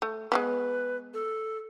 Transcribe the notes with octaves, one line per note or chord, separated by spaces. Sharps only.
A3
G#3 A3 B3 B4
A4